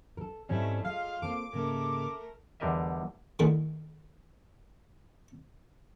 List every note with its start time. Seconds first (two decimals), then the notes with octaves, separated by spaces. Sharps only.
0.17 A4 A#4
0.49 G#2 G3 A3 C4 C#4 E4
0.84 G#3 F4 F5
1.22 A#3 C4 A4 D6
1.53 G#2 C#3 A3 A#3 A#4
2.60 E2 D3 G3 A#4 D#5 E5
3.39 D3 D#3 A3 E4 G#4 A#4